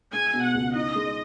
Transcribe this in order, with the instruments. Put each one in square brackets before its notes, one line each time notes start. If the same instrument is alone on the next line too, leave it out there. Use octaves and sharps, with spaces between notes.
[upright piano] G#3 [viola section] G#5
[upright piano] B2
[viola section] F#5
[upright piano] C#2
[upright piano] D#4 [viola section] D#5
[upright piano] G#3